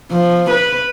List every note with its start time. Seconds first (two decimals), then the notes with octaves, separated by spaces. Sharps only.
0.11 F3
0.51 B4